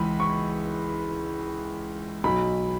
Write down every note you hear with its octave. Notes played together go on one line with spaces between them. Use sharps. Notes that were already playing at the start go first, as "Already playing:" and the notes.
Already playing: C#2 E3 B5
C#6
B1 B2 B5